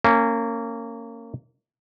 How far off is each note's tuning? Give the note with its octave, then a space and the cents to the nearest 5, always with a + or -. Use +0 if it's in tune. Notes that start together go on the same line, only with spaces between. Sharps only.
A#3 -25 C#4 -5